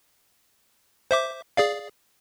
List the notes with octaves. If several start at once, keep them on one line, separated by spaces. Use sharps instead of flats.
C5 E5 D6
G#4 D5 F5